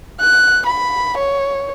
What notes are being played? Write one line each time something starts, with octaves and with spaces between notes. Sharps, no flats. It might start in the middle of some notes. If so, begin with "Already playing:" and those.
F#6
B5
C#5